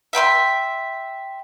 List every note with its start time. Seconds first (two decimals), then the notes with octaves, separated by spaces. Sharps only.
0.13 E5 G5 B5 C6